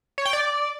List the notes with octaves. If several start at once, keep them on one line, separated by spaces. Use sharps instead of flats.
C#5
G5
D5